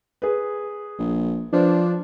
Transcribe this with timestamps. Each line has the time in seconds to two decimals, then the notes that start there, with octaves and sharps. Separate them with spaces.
0.22 G#4 B4
0.99 A#1
1.53 F3 D4 B4 C5